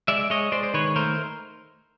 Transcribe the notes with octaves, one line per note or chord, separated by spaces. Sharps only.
G#3 D5 E5
G#3 C#5 D#5
G#3 C5 D5
C5
D#3 B4 C#5
A3 A#4 C5